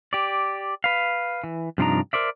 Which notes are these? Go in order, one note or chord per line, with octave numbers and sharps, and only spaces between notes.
G4 D5
B4 F5
E3
G2 C3 F3 D4 D#4 A#5
A#4 C5 D5 E5